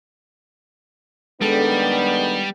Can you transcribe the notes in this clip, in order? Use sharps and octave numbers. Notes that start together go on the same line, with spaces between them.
D#3 G3 G#3 B3 D4 A4 G5